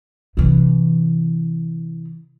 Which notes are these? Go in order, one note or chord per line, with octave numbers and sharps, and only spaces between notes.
C3 E3